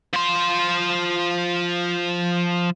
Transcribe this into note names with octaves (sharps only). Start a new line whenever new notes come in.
F3 C6